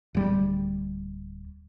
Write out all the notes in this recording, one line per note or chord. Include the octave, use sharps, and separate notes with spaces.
D1 G3